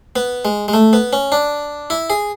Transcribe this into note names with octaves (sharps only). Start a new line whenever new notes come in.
B3
G#3
G#3
A3
B3
C#4
D4
E4
G#4